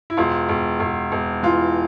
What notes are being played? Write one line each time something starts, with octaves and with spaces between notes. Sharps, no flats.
E4
E1 F4
E1
E1
E1
E3 F4